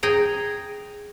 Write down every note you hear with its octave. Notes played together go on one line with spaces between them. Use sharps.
G#4 G5 A#5